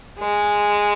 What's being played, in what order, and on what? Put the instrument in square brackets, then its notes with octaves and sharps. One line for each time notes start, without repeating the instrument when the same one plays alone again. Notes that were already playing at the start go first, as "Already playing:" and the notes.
[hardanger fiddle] G#3